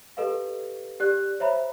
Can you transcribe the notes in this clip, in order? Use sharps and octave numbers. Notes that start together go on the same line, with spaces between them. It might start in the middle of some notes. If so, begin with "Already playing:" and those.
G4 A4 B4 D#5 F5
G4 D5 F#6
C5 C#5 E5 A#5 B5